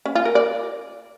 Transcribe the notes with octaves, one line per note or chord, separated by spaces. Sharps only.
C#4
F4
A#4
D5